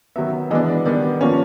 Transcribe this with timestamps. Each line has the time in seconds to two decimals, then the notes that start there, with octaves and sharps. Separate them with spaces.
0.16 D#3 F#3 B3 E5
0.51 E3 G#3 B3 D4 D#5
0.68 D5
0.85 D#3 G3 B3 D4 D5
1.21 F3 A#3 C#4 C#5